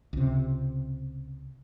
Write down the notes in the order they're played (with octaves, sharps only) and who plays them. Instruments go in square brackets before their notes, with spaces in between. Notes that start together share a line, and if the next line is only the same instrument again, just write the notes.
[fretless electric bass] C#2 C3